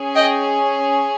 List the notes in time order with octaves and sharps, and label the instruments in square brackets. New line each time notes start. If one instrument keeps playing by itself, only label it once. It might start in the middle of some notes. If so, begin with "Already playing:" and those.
Already playing: [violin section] C#4 G#4
D#5 G5